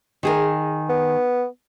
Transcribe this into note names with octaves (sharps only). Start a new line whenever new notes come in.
D#3 G#4 A#4
B3